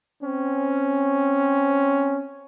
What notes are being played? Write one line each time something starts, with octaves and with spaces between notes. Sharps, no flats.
C4 C#4